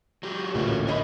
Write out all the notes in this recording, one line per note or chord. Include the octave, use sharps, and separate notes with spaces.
F#3 G4
A1 D2 A#2 F#4 A#4 C#5
A#3 G#4 A#4 C#5 D#5 B5